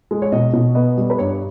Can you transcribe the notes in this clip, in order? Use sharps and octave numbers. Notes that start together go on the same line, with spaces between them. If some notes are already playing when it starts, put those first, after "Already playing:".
G#3
C#5
B2 D#5
B2
B3 D#5
G3
B4
G2 C#5